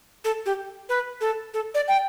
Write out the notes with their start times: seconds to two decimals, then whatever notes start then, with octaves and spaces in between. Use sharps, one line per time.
0.25 A4
0.46 G4
0.89 B4
1.21 A4
1.54 A4
1.75 D5
1.88 G5